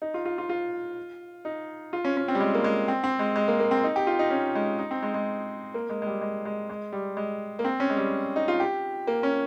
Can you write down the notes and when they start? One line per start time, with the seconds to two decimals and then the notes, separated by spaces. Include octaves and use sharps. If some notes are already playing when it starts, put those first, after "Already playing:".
0.02 D#4
0.14 F4
0.25 F4
0.38 F4
0.49 F4
1.45 D#4
1.93 F4
2.05 C#4
2.17 C#4
2.28 C4
2.35 G3
2.40 G#3
2.54 A#3
2.64 G#3
2.88 C4
3.04 C4
3.19 G#3
3.36 G#3
3.48 A#3
3.60 A#3
3.71 C4
3.84 D#4
3.96 G4
4.07 F4
4.19 D#4
4.30 C#4
4.55 G#3
4.79 D#4
4.91 C4
5.03 G#3
5.14 G#3
5.74 A#3
5.90 G#3
6.02 G#3
6.06 G3
6.21 G#3
6.45 G#3
6.70 G#3
6.93 G3
7.17 G#3
7.59 A#3
7.65 C4
7.80 C#4
7.90 G#3
7.97 G3
8.36 D#4
8.48 F4
8.60 G4
9.07 A#3
9.23 C#4